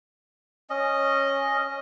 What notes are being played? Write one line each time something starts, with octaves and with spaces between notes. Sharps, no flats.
C#4 D#5